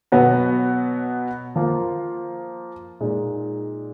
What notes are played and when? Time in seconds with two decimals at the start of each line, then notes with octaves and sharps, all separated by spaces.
0.12 B2 F#3 B3 F#4
1.56 F3 A#3 F4
3.01 A#2 G#3 D#4